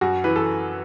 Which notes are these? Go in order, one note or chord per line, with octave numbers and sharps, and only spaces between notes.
F#2 F#4
E3 B4
A4